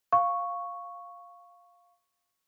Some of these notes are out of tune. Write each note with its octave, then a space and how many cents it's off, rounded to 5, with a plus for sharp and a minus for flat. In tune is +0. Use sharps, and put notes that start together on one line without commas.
F5 +5 C#6 +0